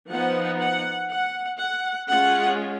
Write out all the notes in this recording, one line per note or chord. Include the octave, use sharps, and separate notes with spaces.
F3 B3 D#4 F#5
F#5
F#5
F#5
G#3 C#4 F4 F#5